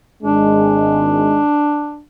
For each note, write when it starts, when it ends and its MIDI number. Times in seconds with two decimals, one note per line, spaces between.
0.23 1.42 32
0.23 1.42 56
0.23 2.02 62